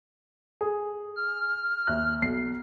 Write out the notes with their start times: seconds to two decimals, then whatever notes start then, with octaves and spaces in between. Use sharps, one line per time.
0.61 G#4
1.16 F6
1.87 D#2 E5 F#6
2.22 B1 C7